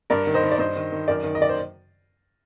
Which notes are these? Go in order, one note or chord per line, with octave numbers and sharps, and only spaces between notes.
G2 A#4 D5
D#3
C5 D#5
D#3
D5
G2 C5 D#5
D#3
D#3
F#2 A#4 D5
D#3
D#5
D#3 D5
C5